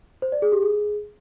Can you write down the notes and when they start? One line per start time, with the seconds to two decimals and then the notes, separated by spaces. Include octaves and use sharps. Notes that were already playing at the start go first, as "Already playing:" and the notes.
0.22 C5
0.32 D5
0.42 G#4
0.52 G4
0.62 G#4